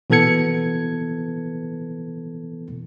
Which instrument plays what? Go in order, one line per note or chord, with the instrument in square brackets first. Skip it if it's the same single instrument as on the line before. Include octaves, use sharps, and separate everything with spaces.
[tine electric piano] B2 E3 B3 A4 G#6 C#7